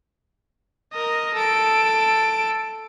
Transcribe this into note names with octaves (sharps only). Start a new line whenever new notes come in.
A#4 D#5
A4 D7